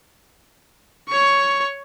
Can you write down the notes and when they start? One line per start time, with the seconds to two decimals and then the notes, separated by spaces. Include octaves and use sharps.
1.09 C#5 C#6